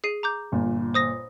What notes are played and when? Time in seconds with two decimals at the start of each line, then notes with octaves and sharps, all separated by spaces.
0.04 G#4 C7 D#7
0.23 A#5 D6 G6
0.52 G1 A#2
0.94 C5 D#6 A#6